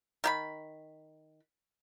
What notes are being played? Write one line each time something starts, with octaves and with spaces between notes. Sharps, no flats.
D#3 G4 B5